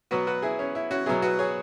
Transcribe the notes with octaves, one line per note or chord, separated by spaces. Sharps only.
B2 F#3 B3 F#4 B4
F#4 B4
E4 G#4
C#4
E4
C#4 F#4
B2 F#3 B3 E4 G#4
F#4 B4
G#4 C#5